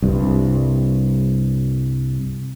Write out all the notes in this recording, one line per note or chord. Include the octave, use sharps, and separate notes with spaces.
C2 G2